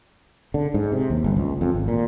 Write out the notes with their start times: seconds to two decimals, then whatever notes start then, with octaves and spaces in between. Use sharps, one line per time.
0.54 D3
0.74 G#2
0.92 C3
1.10 D#2
1.24 G1
1.37 C#2
1.61 F2
1.74 G#1
1.88 A#2